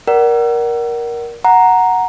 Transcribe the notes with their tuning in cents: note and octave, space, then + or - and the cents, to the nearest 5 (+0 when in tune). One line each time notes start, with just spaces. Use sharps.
A#4 +15 D5 +0 F#5 +30
F#5 +0 A#5 +0